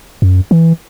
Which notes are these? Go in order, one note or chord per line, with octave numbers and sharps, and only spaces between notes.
F#2
E3